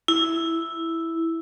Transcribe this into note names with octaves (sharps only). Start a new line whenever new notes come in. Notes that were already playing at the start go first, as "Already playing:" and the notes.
E4